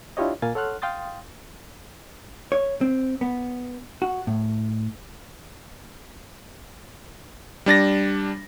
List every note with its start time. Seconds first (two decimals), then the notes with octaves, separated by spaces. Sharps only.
0.17 D4 E4 F4 G4 C#5 D#5
0.42 A#2 A#3 F5 G#5 A6
0.55 A4 C#5 F#5 C6 F6 F#6
0.82 F5 G5 C6 D#6 A6
2.52 C#5
2.81 C4
3.21 B3
4.02 F#4
4.27 A2
7.66 G3 D4 A6 A#6